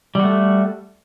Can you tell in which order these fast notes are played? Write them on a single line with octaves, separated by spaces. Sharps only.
G3 F#4 A3